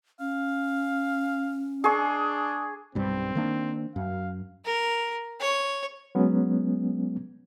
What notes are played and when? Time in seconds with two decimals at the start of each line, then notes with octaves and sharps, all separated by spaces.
0.20 C#4 F5
1.84 D4 G#4 C#6
2.95 B1 G2 G3 C4
3.35 D#3 A#3 D4
3.96 F#2 F5
4.65 A#4
5.41 C#5
6.15 F#3 G#3 B3 C#4